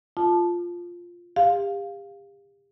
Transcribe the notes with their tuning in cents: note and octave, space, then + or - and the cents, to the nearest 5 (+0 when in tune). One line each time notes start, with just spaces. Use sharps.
F4 +0 A5 -10 D6 +45
G4 +35 F5 +0